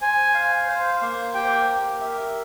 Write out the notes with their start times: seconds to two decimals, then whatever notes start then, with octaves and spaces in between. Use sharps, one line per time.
0.01 C5 G#5
0.34 F5
0.68 C5
1.02 A#3
1.34 G4 G5
1.68 A#4
2.01 E5